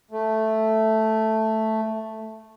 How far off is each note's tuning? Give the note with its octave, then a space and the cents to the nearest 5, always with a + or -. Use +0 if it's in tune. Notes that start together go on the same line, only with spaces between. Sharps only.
A3 +0